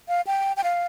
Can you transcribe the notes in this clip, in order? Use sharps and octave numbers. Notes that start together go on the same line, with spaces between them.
F5
G5
G5
F5